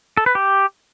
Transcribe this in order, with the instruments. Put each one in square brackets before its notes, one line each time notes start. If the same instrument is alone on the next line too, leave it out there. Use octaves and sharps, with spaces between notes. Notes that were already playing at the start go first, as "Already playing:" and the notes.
[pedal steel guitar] A4
B4
G4